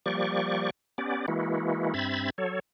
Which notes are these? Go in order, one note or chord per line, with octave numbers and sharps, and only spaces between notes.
F3 G3 A#3 G4 D5 C#6
B3 C#4 G4 D5
E3 G#3 A#3 E4 F#4
G2 C4 E5 B5 G#6 A6
F#3 A4 C#5